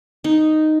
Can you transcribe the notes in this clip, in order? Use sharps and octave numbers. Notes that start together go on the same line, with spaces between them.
D#4